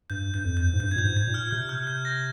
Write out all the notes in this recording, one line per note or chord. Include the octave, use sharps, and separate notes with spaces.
G2 G6
G2 G6
F2
G6
G#2
G2 G6
G#6
A#2 G6
G#2
G#6
A#2
F6
C3 G6
F6
G6
A#6